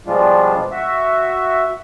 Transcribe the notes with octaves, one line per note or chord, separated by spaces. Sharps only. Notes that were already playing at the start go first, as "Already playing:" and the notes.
B2 F3 G3 G#3 D4 F4
F#4 E5